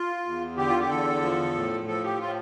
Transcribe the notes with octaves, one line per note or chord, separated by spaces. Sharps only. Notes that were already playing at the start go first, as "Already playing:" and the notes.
Already playing: F4
E2
D3 G4
F4
G4
E2 A4
F3
A2
F3 A4
G4
A2 F4